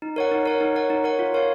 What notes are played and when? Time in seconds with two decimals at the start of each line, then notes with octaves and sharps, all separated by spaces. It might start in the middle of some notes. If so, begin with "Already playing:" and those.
0.02 D#4
0.16 A#4 C#5 F#5
0.31 D#4
0.46 A#4 C#5 F#5
0.61 D#4
0.75 A#4 C#5 F#5
0.90 D#4
1.04 A#4 C#5 F#5
1.19 F4
1.34 A#4 C#5 F5